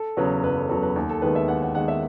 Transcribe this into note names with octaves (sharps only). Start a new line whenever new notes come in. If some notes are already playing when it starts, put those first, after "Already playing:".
Already playing: A4
E2 C#3 F#3 B4
F#1 B4
A4
E2 C#3 F#3 A4
B4
D#2
A4
D#3 G#3 B3 B4
E5
D#2 F#5
F#5
D#3 G#3 B3 F#5
E5